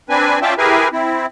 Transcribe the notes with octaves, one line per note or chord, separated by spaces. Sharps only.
C4 D4 B4 G#5
C#4 F4 D5 E5 G5 A5
E4 G4 G#4 A#4 B4 G#5
C4 E4